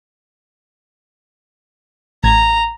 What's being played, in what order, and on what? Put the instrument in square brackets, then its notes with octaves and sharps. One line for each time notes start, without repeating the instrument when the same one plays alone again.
[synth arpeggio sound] A1 G#6 [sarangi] A#5